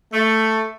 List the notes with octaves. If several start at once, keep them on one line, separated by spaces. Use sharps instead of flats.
A3